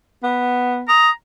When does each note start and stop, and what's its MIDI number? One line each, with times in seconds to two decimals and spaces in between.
0.23 0.85 59
0.89 1.11 82
0.89 1.10 87